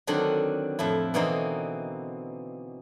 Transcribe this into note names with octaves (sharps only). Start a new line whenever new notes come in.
D3 D#3 F#3 C4 D4 F#4
F2 A2 E4
B2 D3 E3 A#3 C4 D#4